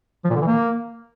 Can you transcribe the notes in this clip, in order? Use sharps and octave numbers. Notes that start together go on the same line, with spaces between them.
F3
A#2
D3
E3
A#3